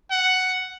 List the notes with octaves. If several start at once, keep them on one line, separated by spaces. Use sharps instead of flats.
F#5